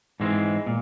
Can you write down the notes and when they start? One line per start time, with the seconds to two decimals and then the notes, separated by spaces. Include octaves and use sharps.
0.20 G#2 E3 G#3 C4
0.67 A#2